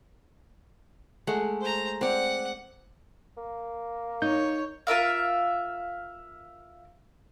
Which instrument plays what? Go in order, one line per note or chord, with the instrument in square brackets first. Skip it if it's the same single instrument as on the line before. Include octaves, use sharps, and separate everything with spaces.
[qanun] G#3 A3 F#5
[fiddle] C5 A#5
[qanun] C4 D5 [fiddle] F#5
[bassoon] A#3
[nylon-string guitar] D#4 [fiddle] C#5 [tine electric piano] G6
[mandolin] F4 A#4 E5 F5